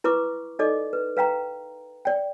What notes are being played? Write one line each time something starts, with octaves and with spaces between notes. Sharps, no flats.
E4 B4 C#6 D6
D#4 A4 D5 D#5 D6
B4
B4 F5 G5 A#5
D5 G5